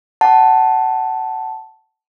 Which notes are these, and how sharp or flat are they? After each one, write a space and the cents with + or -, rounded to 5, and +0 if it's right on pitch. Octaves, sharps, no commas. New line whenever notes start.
F#5 +25 A5 +0